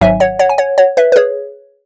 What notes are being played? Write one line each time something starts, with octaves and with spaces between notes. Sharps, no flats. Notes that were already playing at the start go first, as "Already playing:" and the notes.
G#1 G#2 F#3 E5 G#5
C#5 F#5
C#5 F#5
G#5
C#5 F#5
C#5 F#5
B4 E5
B4
G#4 C#5